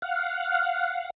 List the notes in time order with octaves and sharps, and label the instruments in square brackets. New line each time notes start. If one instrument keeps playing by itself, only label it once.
[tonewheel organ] F5 F#5